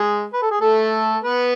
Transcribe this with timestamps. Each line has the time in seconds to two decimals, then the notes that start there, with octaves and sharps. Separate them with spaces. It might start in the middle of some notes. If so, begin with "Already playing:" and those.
Already playing: G#3 G#4
0.33 B4
0.42 A4
0.51 G#4
0.61 A3 A4
1.23 B3 B4